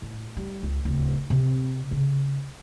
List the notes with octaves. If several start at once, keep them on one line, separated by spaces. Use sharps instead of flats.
A2
G3
C#2
D1 C#3
C3 C4
C#3